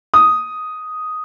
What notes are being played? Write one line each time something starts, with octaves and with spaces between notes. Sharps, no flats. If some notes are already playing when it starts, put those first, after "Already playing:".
D#6